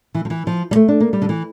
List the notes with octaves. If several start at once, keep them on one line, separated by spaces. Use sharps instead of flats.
E3
F3
E3
F3
G3
A3
D4
A#3
G3
D3
E3